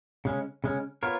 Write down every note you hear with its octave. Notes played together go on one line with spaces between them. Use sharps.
C#3 G#3 C#4
C#3 G#3 C#4
B3 F4 A#4 C#5